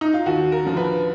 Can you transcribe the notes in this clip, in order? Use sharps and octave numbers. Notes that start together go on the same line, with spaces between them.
D#4
F4
D#2 F#4
A#4
D3 F3
B4